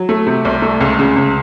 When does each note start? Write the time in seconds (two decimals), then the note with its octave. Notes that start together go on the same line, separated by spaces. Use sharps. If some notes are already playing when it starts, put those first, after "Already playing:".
Already playing: F#3
0.09 A3
0.27 C3
0.45 C2
0.62 A3
0.81 C#2
0.99 C#3
1.16 C#2